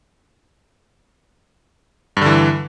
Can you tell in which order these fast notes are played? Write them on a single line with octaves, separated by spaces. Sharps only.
G2 D3 E3